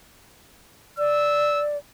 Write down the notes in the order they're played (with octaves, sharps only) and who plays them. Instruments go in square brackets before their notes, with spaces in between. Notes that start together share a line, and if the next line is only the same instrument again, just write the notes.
[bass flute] D5 [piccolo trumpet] E6